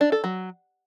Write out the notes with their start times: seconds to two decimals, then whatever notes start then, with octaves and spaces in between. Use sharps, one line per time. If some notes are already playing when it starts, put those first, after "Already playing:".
0.01 D4
0.12 A4
0.24 F#3